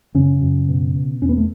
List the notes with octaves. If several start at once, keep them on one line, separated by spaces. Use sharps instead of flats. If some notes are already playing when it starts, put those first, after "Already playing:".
F#2 C#3 C#4
F#2
B2
B2
E2 C#4
B3
A3